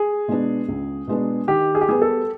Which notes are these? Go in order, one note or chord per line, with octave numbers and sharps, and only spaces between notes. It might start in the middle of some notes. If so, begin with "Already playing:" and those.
Already playing: G#4
B2 G#3 B3 D4
C#2
B2 G#3 B3 D4
D#3 G4
G#4
G4
G3 B3 G#4
A4